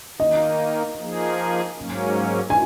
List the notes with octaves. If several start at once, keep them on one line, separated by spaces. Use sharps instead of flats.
D#3 A#3 D#4 D#5
F3 A#3 D#4 G#4
G#2 F#3 A#3 C#4
G#5